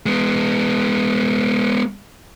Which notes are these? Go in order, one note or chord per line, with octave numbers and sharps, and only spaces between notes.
G#3 B3